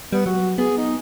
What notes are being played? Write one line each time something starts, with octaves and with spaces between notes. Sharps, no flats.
G3 B3
F#3 F#4
B3 G#4
D#4